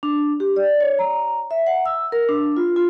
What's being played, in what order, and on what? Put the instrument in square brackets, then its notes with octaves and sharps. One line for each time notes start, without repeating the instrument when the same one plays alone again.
[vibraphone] D4
G4
D5
C#5
A#5
E5
F#5
E6
A#4
D4
F4
F4